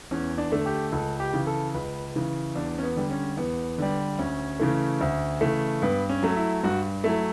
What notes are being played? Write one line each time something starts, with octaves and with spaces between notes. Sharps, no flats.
E2 C#4
D4
D3 A3
G4
C#2 A4
G4
C#3 E3
A4
C#2 B4
C#3 E3
E2 D4
C#4
B3
D3 G3
C#4
E2 B3
D3 G3
D2 C#4
C#3 E3 A3
D2
C#3 E3 A3
G2 B3
C#4
F#3 A3
E4
G2 F#4
F#3 A3 E4